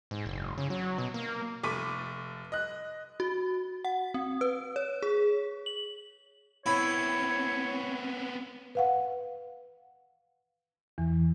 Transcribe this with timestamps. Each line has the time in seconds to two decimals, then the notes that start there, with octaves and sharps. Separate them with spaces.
0.11 G#2
0.26 F#1
0.58 C#3
0.70 F#3
0.98 B2
1.14 A#3
1.64 F1 A4 C#6 D6 B6 D#7
2.52 D#5 F#6
3.20 F#4
3.85 F#5
4.14 C4
4.41 B4
4.76 C#5
5.02 G#4
5.66 F#7
6.66 B3 C4 E4 C#5
8.75 B4 F5 F#5
10.98 E2 E3